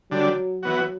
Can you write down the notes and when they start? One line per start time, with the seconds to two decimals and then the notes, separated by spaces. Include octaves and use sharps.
0.11 D3 F#3 G3 D4
0.62 E3 F#3 B3 F#4